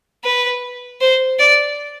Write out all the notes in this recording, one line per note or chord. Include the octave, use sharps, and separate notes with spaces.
B4
C5
D5